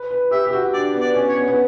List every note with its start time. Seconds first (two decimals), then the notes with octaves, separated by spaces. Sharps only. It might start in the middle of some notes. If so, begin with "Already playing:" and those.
Already playing: B4
0.11 B4
0.31 G4 E5
0.47 G4
0.53 F#4
0.73 D4 D5
0.94 B3
1.01 D5
1.15 C#4
1.29 C#5
1.36 B3
1.48 B3